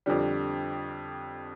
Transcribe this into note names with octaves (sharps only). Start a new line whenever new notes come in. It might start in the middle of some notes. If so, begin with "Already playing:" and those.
F2 D3 G3